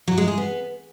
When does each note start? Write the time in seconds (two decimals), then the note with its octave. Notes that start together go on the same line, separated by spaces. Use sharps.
0.08 F#3
0.18 G#3
0.28 G#4
0.38 B3